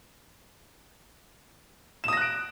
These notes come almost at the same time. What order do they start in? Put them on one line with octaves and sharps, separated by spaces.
E7 D#6 A#6 F#6 D7